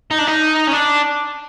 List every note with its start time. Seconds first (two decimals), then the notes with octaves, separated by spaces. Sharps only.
0.11 D#4
0.18 D4
0.27 D#4
0.67 C#4
0.73 D4